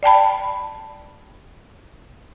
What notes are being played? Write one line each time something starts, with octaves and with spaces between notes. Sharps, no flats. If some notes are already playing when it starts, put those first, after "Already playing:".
D5 G5 A5 B5